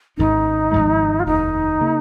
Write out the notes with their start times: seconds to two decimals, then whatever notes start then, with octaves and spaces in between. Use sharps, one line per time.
0.17 G#1 G#2 D#3 C#4 D#4
0.72 G#1 G#2 F3 G#3
1.20 F4
1.26 F1 D#2 D#3 D#4
1.81 C#3 A#3